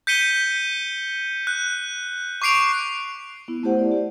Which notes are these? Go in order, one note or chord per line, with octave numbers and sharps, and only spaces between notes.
G6 B6 C#7 D#7 G7
F#6
C#6 D6 C7 D7 F7
B3 E4
A3 E4 G4 C5 F#5
D5
G4